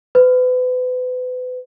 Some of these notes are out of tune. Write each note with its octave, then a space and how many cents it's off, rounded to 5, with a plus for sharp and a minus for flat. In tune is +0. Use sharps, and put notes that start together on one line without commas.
B4 +35